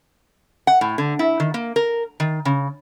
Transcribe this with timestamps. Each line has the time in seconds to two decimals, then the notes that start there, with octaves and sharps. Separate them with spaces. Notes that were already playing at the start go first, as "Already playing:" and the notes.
0.67 F#5
0.81 A2
0.98 D3
1.19 E4
1.40 D#3
1.54 A#3
1.76 A#4
2.20 D#3
2.45 C#3